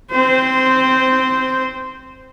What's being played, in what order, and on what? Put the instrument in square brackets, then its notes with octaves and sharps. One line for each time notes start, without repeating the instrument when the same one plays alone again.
[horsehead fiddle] C4 C5